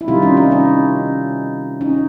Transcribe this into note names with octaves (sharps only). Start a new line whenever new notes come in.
E4
C3 D#3 G3 D#4 F4
C#4 D#4
C#4 D#4
C#4 D#4
C#4 D#4